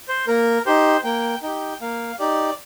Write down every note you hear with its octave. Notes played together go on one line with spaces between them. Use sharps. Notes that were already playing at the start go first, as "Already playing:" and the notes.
C5
A#3 A#4
D#4 G4 C5
A#3 G5
D#4 G4 G5
A#3 F5
D#4 G4 D5